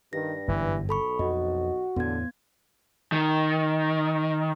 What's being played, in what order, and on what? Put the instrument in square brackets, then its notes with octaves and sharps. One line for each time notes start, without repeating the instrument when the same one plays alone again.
[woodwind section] G2 [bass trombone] D#3 [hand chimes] A#6
[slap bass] G1 F#2 A2 [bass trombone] E3
[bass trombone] B1 [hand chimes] A4 B5 C#6
[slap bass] F2 [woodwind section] F#4 [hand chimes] D#5
[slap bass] E2 A2 [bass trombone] D3 [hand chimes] B3 G#6
[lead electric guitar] D#3